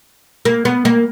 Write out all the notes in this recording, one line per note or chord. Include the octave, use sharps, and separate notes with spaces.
A#3
B3
A#3